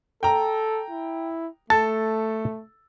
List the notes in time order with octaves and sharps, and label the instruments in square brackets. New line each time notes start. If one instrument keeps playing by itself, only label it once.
[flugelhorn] A4 [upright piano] G5 A#5
[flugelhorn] E4
[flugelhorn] A3 [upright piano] A4 [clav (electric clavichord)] A5